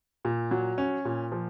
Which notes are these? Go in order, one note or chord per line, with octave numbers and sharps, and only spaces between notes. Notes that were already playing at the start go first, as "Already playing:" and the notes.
A#2
F#3
C#4
A#2
F3